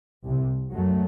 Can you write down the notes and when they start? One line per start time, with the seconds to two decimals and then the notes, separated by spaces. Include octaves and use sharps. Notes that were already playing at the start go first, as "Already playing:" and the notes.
0.24 C2 C3
0.73 F#2 F#3 A3